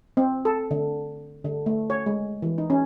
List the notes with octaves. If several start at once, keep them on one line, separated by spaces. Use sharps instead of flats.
C4
A4
D3
D3
A3
C#5
G#3
E3
D#4
C#4